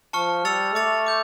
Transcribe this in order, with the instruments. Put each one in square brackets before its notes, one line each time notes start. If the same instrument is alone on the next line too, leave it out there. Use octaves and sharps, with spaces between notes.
[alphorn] F3 [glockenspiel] A5 C#6 F6 C#7
[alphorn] G3 [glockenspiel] E6 A6 C#7 F7
[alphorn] A3 [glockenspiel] D6 A6 C#7 F7
[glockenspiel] D6 G6